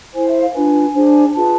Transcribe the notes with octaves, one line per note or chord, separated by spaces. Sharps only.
E4 A4 C5 G#5
E5
F5
D4 F4 B4 G#5
D4 G#4 C5
F4 G#4 B4 A5